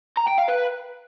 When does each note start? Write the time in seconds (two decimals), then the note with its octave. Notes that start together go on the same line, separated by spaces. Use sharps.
0.17 A#5
0.28 G5
0.38 F5
0.48 B4